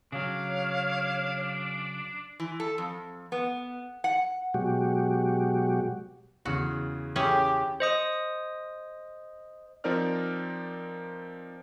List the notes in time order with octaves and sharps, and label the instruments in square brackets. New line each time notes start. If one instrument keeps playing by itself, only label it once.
[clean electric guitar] C#3 F#3 [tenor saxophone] D4 [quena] C#5 [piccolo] F5
[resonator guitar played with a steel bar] E3
A4
F2
B3
F#5
[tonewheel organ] B2 F#3 G#3 F#4 G4
[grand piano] E2 C#3 [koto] F#4
[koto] E3 C#4 G#4 [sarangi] G4
[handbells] C5 D#5 D#6
[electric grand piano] F3 C4 D#4 A#4 D5 F6